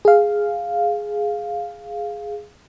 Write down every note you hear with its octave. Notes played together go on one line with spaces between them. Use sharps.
G#4 F5